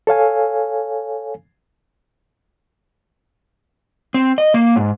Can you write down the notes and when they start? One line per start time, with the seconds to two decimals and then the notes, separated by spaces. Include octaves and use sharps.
0.07 A4 C#5 F5 G#5
4.14 C4
4.38 D#5
4.54 A#3
4.76 G#2